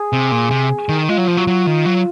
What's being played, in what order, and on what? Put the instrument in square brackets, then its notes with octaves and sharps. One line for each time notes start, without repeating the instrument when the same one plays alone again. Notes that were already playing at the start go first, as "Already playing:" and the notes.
Already playing: [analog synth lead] G#4
[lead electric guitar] C3
A#2
C3
D#3
[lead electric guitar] G#3 [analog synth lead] F4
[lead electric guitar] F#3
F3
F#3
F#3
D#3
F#3